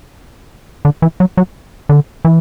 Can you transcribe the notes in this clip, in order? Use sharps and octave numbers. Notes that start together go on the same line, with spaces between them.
D3
E3
F#3
F#3
D3
E3